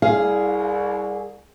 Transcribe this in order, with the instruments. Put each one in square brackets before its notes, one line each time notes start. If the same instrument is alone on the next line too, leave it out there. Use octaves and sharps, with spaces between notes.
[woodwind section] C2 [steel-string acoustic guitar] G#4 [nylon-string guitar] F5